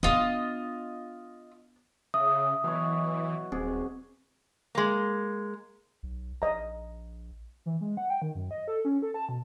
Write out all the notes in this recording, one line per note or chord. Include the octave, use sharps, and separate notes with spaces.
B3 D4 F4 D#5
C#3 E5 D#6
B2 E3 F#3 C#5
D#1 C4 G#4
G#3 A#3
B1
A#1 D#5 A#5
E3
G#3
F#5
G5
D#3
F#2
D#5
A4
C#4
A4
A5
B2